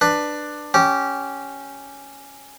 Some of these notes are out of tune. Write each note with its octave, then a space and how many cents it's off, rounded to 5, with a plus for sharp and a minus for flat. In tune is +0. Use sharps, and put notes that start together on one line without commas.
D4 +10 B4 +0
C#4 +0 G4 -15